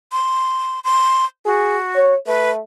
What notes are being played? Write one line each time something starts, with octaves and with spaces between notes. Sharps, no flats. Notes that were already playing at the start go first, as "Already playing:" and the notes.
C6
C6
F#4 G#4
C#5
A3 B4